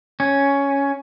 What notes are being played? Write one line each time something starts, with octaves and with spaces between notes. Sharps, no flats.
C#4